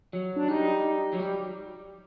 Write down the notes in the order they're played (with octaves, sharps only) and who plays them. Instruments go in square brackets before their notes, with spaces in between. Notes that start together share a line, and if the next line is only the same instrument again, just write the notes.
[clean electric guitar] F#3
[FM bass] D4
[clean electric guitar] G3 [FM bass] D#4
[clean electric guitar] F#3
G3